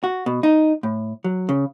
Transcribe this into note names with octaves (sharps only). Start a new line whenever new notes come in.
F#4
B2
D#4
A2
F#3
C#3